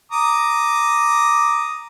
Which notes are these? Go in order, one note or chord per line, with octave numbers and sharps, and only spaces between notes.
A#5 D6 D#6